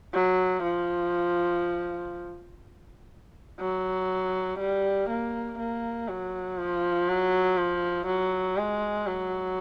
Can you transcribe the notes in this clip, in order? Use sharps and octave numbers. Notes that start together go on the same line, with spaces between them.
F#3
F3
F#3
G3
A#3
A#3
F#3
F3
F#3
F3
F#3
G#3
F#3